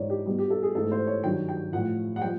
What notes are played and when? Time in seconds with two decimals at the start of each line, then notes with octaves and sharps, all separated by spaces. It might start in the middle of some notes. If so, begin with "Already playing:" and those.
Already playing: G#2 E3 G#3 C#5 D5
0.10 G4
0.26 B2 G3 G4
0.39 G4
0.50 A4
0.63 G#4
0.75 G#2 E3 A3 A4
0.92 C5
1.07 C#5
1.23 G2 D#3 F#3 G5
1.49 G5
1.73 A2 F3 A3 F#5
2.16 F#5
2.22 F3 A3 G5